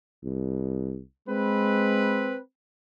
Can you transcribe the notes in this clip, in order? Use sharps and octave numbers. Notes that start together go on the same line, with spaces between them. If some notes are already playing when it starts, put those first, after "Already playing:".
C2
G#3 C4 B4